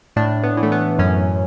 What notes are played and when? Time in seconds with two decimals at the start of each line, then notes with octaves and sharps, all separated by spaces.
0.16 A2 D4
0.43 B3
0.57 E3
0.63 A3
0.72 B3
0.99 F#2 C#4